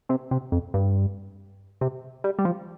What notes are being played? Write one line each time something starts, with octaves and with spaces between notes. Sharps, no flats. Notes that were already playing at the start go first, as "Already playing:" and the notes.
C3
C3
F2
G2
C3
G3
G3
F3